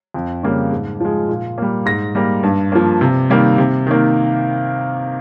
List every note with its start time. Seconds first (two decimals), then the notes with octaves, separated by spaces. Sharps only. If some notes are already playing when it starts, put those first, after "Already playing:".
0.14 F2
0.43 C#3 G3 A#3
0.72 G#2
1.01 F3 G#3
1.29 A#2
1.58 G3 A#3
1.86 G#2 A#6
2.15 G3 A#3
2.43 G2
2.72 F3 A#3
3.01 C3
3.30 D#3 G3 A#3
3.58 C3
3.87 D#3 A#3